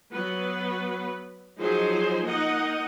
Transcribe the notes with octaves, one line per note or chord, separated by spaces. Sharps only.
F#3 B3 B4
F3 F#3 D#4 G#4 C5
A#3 D#4 D#5 F#5